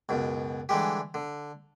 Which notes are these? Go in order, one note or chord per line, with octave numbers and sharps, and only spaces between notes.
C#2 F#2 B2
D3 E3 G3 G#3 G4
D3